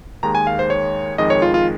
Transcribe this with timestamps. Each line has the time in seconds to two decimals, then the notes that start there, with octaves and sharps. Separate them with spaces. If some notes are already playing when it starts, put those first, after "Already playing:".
0.23 D#2 D#3 G#3 A#5
0.35 G#5
0.47 F5
0.59 C5
0.70 C#5
1.18 F2 D#3 G#3 D#5
1.30 C#5
1.42 F4
1.54 F4